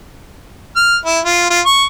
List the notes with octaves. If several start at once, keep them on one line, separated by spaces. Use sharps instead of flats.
F6
E4
F4
F4
C#6